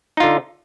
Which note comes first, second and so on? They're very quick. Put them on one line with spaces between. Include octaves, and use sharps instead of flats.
D#4 F4 D3